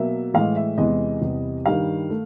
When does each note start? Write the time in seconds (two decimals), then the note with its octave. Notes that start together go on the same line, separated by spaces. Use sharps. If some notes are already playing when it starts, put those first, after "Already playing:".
Already playing: B2 F#3 A#3 E5
0.34 A2 E3 G#3 F5
0.56 E5
0.78 E2 C3 E3 G#3 D#5
1.21 E2 C3 E3 G3 B3
1.66 G2 D#3 G3 F5
2.10 A3